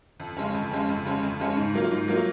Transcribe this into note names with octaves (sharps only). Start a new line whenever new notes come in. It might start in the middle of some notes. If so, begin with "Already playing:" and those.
F2
C#3 G#3 C#4
F2
C#3 G#3 C#4
F2
C#3 G#3 C#4
F2
C#3 G#3 C#4
G#2
F#3 A#3 F4
G#2
F#3 A#3 F4